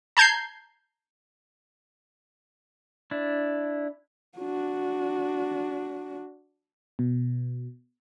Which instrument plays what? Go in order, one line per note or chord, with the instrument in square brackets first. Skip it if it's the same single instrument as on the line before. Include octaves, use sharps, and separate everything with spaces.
[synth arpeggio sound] A5 A#5 G6 G#6 C7
[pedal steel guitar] D4 E4
[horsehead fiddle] D4 F#4
[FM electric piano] B2